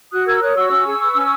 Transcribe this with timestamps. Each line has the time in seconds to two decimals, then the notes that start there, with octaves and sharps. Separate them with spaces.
0.12 F#4 D#6 F#6
0.27 A#4 E6 G#6
0.42 C#5 D#6 F#6
0.56 F#4 C#6 E6
0.71 C#4
0.86 G#4
1.00 B4
1.15 C#4